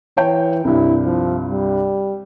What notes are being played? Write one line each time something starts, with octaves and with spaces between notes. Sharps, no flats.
E3 C#5 G5
C2 G2 E4
F3
G3